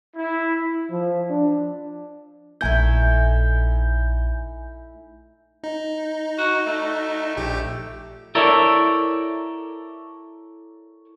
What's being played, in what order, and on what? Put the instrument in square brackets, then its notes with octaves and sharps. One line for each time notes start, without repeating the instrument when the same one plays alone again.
[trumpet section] E4
[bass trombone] F3
D4
[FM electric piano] A#1 G#5 G6 [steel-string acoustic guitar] A3 D#4 E4
[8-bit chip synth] D#4
[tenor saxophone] F#4
A3
[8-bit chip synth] A#1 G4 G5
[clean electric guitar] E4 A4 A#4 C#5 D5 E5